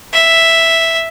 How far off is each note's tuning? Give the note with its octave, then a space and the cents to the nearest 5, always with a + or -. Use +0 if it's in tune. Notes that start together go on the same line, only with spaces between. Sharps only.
E5 +0